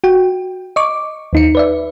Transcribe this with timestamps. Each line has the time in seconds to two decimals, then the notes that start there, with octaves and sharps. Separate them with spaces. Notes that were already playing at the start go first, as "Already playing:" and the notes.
0.04 F#4 G5
0.76 D#5 C#6 D6
1.33 D#2 D#4 C#7
1.55 B4 D5 E5